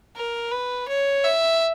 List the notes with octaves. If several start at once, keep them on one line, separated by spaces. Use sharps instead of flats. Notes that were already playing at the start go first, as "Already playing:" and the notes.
A#4
B4
C#5
E5